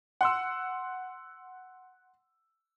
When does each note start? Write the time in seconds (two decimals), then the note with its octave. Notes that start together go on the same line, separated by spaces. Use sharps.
0.21 F#5 C6 E6